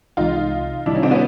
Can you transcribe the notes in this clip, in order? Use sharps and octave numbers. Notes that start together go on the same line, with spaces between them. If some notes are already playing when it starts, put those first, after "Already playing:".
C2 C3 E3 G#3 D#4 F4
C3 D#3 G3 D4 E4
C#4 D#4
C4 D4
B3 C#4